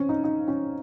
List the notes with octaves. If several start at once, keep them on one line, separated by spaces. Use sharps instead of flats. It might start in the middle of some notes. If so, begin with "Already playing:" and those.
Already playing: C4 C#4
D#4
D#4
C#4